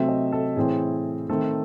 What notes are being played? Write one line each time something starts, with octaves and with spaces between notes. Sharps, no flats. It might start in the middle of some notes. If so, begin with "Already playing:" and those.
Already playing: C3 F#3 A3 C4 E5
D#5
A4
A2 E3 C4 G#4
D#3 A3 C4 A4